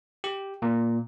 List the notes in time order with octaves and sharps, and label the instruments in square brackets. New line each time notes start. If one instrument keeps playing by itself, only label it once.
[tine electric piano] G4
A#2